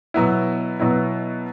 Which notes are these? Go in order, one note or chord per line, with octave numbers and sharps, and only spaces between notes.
B2 F#3 B3 E4
B2 F#3 B3 E4